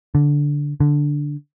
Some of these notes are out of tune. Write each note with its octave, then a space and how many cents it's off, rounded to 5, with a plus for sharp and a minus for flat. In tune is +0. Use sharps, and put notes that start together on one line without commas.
D3 -10
D3 -5